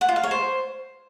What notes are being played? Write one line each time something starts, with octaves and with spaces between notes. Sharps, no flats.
F#5
F4
F5
C#5
C5